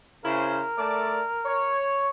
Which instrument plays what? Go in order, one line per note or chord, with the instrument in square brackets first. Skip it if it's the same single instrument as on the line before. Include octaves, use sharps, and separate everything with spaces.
[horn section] C#3 E4 C5 [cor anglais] A#4
[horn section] A3 D5 A5
C#5